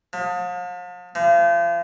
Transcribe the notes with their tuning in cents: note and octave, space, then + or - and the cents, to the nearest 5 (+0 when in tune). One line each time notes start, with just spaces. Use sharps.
F3 +40
F3 -40